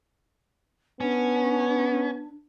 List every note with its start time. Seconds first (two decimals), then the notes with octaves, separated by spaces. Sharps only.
1.01 B3 C#4 D4